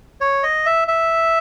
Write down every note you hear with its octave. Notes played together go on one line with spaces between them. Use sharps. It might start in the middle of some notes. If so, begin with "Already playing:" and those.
C#5
D#5
E5
E5